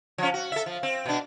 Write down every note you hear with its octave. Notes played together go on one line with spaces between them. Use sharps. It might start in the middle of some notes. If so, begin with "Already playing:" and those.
F3 C#4
F#4
A4 E5
F3
C4
B2 D4